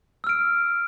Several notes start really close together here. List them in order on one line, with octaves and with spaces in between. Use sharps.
E6 F6 D7